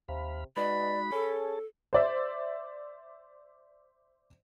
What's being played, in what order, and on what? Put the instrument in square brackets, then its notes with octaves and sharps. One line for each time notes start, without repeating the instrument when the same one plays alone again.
[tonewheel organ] D#2 F5 B5 [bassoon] C3
[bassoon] B2 [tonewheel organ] G#3 D#4 F#4 [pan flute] D5 [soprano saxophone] B5
[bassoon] C#4 [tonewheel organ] G#4 A5 [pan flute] A4
[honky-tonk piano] C5 D5 E5